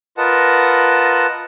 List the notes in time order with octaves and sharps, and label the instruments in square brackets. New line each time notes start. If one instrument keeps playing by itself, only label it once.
[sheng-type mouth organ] F4 A#4 B4 D#5 F#5 A5